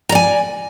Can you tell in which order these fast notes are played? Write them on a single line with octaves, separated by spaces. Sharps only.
A#5 D5 G#5